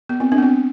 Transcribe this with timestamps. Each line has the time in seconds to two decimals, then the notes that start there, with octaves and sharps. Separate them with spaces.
0.09 B3
0.20 C4
0.32 C4 D4
0.38 B3
0.43 C4